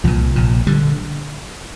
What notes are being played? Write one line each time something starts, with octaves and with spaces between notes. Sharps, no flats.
C2 A#2 F3
A#1 A#2
D3 G3